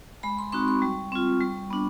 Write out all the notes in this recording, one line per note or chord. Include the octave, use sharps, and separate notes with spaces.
G#3 B5
C6
C4 D#4 F#4 C#6
C#6
G3
C4 F4
G3
B3 D4